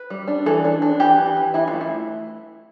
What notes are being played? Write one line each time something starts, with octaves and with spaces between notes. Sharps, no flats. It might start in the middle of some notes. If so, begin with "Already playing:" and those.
Already playing: B4
G3
D4
E3 A4
D4
D4
E3 G4
E3
E3
E3 E4
F4
A3
E4